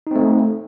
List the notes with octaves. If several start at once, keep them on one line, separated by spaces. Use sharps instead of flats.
A3 C4 D#4